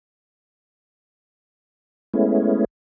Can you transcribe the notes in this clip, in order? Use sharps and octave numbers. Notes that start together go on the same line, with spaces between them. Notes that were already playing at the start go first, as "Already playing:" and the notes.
G#3 A3 B3 C#4 E4